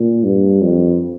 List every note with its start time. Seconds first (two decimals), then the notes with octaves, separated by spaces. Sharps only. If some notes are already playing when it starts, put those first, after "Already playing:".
Already playing: A#2
0.24 G2
0.62 F2